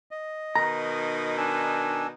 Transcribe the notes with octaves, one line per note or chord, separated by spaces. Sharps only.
D#5
B2 D#3 D#4 A#5
D4 G#5 E6